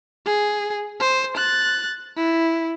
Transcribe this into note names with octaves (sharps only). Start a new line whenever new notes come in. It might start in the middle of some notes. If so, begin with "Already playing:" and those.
G#4
C5
F#6 A6
E4